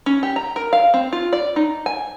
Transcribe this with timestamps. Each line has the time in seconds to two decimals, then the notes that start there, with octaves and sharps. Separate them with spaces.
0.06 C#4
0.23 G4
0.36 A#5
0.56 A#4
0.73 F5
0.94 C4
1.13 F4
1.33 D5
1.56 D#4
1.86 G#5